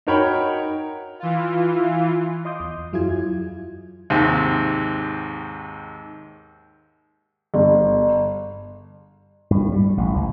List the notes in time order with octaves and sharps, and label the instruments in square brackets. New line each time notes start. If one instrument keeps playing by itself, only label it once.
[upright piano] D#4 F#4 A#4 C#5 G5 B5
[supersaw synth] E3 F4
[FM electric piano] D#5 C6 D6 D#6 G6
E2
F#2 F#3 E4 F4 G#4 G#6
[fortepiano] D#2 G#2 C3
[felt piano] G1
[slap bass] G2
G3
A1
C#2